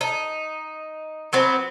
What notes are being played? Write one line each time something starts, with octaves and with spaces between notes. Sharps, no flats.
D#4
F#3 B3 C4